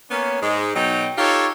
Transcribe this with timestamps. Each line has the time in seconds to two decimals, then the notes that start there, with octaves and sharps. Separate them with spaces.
0.11 A#3 B3 C#4
0.41 G#2 G#3
0.75 B2 F#3 D#4 G5
1.18 D#4 F4 G4 A4 C#5